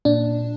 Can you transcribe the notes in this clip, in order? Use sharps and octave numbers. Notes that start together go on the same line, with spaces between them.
A#2 D4